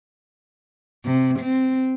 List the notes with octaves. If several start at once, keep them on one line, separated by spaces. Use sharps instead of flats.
C3
C4